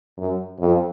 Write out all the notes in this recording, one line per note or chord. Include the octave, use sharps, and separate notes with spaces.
F#2
F2